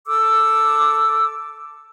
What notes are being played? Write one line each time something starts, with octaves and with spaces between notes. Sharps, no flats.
A4 D6 E6